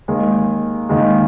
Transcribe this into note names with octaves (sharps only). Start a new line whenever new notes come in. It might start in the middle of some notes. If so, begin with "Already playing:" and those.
D#2 D#3 G#3
D#2 D#3 G#3